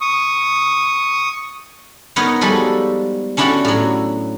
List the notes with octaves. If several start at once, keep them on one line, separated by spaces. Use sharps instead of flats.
C#6 D#6
B3 D#4 A#4 B4 C#5
F3 G3 G#3 F#4 A4
C#4 D4 E4 F#4 G4 A4
A2 F#3